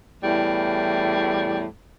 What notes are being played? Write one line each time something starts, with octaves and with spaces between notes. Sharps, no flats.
E2 A2 E3 G3